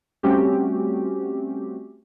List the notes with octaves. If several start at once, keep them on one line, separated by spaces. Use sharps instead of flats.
G3 A3 C4 C#4 F#4 G4